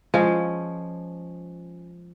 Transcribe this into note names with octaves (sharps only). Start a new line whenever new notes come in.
F3 G#3 C#4